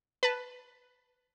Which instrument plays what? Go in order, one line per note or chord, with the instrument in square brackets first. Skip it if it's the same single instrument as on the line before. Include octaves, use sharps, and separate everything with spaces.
[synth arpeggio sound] B4 A5